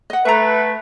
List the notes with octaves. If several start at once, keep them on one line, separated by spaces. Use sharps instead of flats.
D#5 F#5
A3 B4 E5 A#5